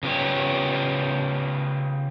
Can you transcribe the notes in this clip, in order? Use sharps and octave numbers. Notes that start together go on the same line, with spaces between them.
C#3 B3 F4 G4 C#5